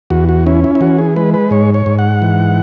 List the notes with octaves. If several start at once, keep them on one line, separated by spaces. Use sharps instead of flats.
E2 F#4
F#4
C#4 E4
E4
E4
E3 F#4
G#4
G#3 B4
B4
G#2 C#5
C#5
G#2
F#5
E3